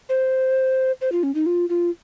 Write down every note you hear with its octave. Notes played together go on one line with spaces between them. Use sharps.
C5
C5
F4
C#4
D#4
F4
F4